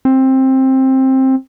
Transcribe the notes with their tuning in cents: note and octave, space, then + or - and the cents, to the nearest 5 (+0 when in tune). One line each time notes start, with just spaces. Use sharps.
C4 +15